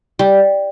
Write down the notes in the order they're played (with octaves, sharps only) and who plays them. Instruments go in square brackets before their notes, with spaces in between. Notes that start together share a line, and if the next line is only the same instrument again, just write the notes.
[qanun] G3